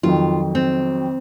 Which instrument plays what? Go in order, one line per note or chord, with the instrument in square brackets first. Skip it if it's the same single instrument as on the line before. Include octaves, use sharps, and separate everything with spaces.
[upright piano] F2 D#3 F#3 [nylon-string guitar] F4
[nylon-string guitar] C4